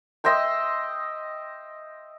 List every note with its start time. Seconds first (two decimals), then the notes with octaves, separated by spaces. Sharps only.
0.24 D#5 E5 G5 C6